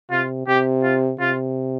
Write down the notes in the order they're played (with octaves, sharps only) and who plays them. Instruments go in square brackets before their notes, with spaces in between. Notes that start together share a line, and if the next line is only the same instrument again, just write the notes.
[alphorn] C3 [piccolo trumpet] F4
[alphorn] C3 [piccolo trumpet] G4
[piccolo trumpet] F4
[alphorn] C3 [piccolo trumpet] F4